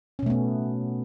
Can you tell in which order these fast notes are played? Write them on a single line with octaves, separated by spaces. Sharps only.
C#4 B2 A3 B3